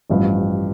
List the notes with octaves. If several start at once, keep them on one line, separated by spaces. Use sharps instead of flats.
A1 G2 F3